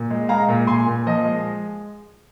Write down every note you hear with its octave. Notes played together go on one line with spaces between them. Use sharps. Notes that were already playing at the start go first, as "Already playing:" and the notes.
Already playing: A#2
G#3
G#3 F5 A#5
A#2
A#2 G#5 C6
A#2
F3 D#5
G#3